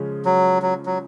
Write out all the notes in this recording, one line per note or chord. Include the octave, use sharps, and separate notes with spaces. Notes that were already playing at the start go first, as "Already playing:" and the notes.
Already playing: C#3 F3 G#3 C#4
F#3
F#3
F#3